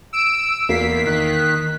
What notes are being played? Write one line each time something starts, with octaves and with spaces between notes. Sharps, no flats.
E6 D7
E2 A#3 B6 C7
D#3 F#6